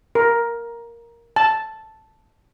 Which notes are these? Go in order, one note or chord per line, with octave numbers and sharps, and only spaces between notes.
A#4
A5